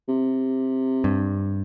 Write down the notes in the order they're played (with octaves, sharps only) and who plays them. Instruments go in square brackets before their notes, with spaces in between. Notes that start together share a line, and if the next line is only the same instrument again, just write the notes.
[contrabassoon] C3
[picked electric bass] G2